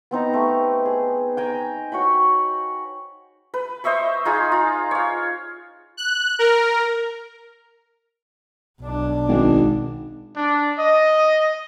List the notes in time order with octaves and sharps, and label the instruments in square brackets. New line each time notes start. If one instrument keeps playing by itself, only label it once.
[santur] B3 C4 D#4 A#5
A3 G4
G#4
G5 G#5 A#5
F#4 C#5 G5 B5
B4
C5 D#5 E5 C#6
D#4 F4 G#4
F4
C#5 F5
[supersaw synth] F#6
A#4
[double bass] B1 D4
[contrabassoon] G#1
[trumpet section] D4
D#5